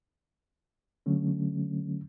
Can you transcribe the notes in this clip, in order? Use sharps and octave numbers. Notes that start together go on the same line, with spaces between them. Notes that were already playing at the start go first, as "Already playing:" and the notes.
D3 F#3 A3 C#4